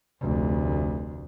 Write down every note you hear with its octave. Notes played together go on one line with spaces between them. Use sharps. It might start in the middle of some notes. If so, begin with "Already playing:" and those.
F1 D2